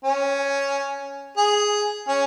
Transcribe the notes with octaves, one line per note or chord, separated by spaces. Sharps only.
C#4
G#4
C#4